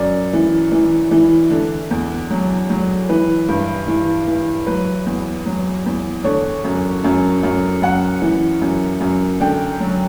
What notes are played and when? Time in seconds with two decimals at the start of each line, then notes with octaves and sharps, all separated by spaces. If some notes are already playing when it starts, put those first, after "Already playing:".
Already playing: F#2 D5
0.33 E3
0.72 E3
1.11 E3
1.50 D3
1.91 E2
2.30 F#3
2.70 F#3
3.09 E3 B4
3.48 G2
3.88 E3
4.27 E3
4.66 F#3 B4
5.06 E2
5.46 F#3
5.86 E2
6.24 D3 C#5
6.64 F#2
7.04 F#2
7.43 F#2
7.82 F#2 F#5
8.22 E3
8.62 F#2
9.01 F#2
9.40 D3 G5
9.80 F#3